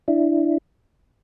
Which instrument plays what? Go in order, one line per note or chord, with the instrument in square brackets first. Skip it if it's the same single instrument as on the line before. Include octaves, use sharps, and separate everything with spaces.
[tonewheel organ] D4 E4